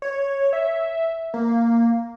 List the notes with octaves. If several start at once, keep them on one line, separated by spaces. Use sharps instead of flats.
C#5
E5
A#3